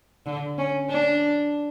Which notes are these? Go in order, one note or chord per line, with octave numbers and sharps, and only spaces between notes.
D3
C#4
D4